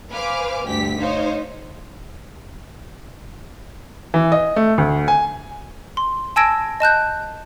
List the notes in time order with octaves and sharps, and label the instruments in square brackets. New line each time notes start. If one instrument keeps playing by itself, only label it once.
[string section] B4 C5 F5 G#5 D6 F6
D2 G2 G4 B6
D#4 C5 C#5 F5
[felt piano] E3
D#5
A3
D2
G#5
[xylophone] C6
G#5 A5 E6 G#6 A#6 D7
D#5 A5 F#6 G6